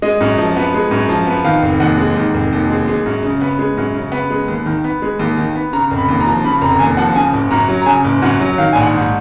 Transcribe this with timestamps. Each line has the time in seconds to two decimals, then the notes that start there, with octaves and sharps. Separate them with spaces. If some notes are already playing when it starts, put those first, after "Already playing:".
0.02 G#3 D#5
0.21 F#2
0.38 F3
0.57 B3
0.74 G#3
0.91 F#2
1.09 F3
1.27 B3
1.44 D#3 F5
1.62 F1
1.80 D#2 F#5
1.98 G#3
2.16 D#3
2.34 F1
2.53 D#2
2.70 G#3
2.87 G#3
3.06 F#2
3.23 C#3
3.41 B3
3.59 G#3
3.77 F#2
3.95 C#3
4.12 B3
4.31 G#3
4.48 D#2
4.66 D#3
4.84 B3
5.02 G#3
5.19 D#2
5.37 D#3
5.55 B3
5.73 C#3 A#5
5.91 F1
5.97 B5
6.09 D#2
6.21 A#5
6.26 F3
6.44 C#3 B5
6.61 F1 A#5
6.73 A#5
6.79 D#2 G#5
6.97 F3 F#5
7.15 C#3 G#5
7.33 F#1
7.51 F#2 A#5
7.69 F#3
7.82 A#5
7.86 C#3 G#5
8.04 F#1
8.22 F#2 F#5
8.40 F#3
8.58 D#3 F5
8.73 A#1 G#5
8.81 F#5
8.94 G#2